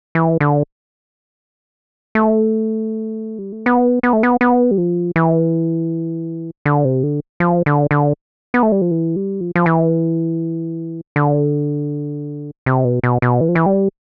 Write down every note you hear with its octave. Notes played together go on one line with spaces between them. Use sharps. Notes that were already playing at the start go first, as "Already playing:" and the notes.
E3
D3
A3
G3
A3
B3
B3
A3
B3
B3
G3
F3
E3
D3
C3
D3
F3
D3
D3
B3
A3
G3
F3
E3
G3
F3
F3
E3
D3
C3
B2
B2
B2
E3
F3
E3
G3